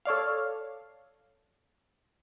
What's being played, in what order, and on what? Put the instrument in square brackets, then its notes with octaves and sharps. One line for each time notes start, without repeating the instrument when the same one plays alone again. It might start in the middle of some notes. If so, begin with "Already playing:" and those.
[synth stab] A4 C#5 D5 F5